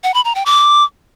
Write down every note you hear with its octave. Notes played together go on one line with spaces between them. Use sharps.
F#5
B5
A#5
G5
D6